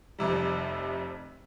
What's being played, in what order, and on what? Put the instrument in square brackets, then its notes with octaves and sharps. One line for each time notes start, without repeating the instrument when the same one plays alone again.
[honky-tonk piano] F1 F2 C3 G3